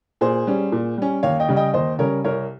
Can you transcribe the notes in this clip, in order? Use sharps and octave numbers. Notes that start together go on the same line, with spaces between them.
A#2 G#4 C5
G3 C#4
A#2
G3 C#4
D#2 C#5 F5
D#5 G5
C#3 G3 C#4
D#5 G5
D#2 C5 D#5
C#3 G3 C#4 A#4 C#5
C2 A#4 C#5